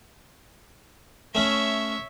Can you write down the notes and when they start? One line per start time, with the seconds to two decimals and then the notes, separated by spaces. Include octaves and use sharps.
1.35 A3 C#4 C#5 E5